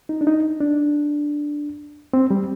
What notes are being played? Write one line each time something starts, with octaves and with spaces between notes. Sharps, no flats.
D#4
D4
D#4
D4
C4
G3